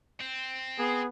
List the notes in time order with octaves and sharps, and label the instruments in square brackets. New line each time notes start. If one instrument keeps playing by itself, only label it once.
[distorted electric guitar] C4
[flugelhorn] B3 [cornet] G#4